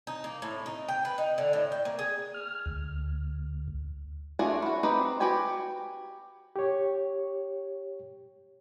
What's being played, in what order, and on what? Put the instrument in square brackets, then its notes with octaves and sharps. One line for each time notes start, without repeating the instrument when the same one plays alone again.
[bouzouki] D#4
A#3
A2
D#4
G5
B4
D#4
D3
A2
G5
A#3
G#4
[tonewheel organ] F6
D2
[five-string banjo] A3 D4 F4 F#4 G#4
E3 F#4
C4 D#4 G4 B4 C5
F#4 G4 B4 G5 G#5
[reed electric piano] G4 C#5